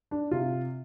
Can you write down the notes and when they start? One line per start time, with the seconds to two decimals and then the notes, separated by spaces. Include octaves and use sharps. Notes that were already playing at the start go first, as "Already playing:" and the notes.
0.11 D4
0.31 C3 F4